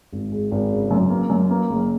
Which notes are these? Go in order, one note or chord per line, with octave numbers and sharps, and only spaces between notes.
G#1
G#3
G#1
C#3
F#2
A#3
F#2
A#3
F#1